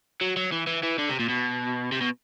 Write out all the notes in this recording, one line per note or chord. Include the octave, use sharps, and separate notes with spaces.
F#3
F#3
E3
E3
E3
D3
C3
A#2
B2
C3
B2